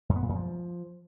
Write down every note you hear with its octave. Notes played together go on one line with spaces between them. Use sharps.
F#2
B3
A#2
F#2
F3